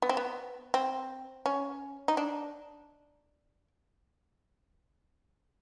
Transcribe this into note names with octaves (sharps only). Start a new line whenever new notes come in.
B3
C4
B3
C4
C#4
D#4
D4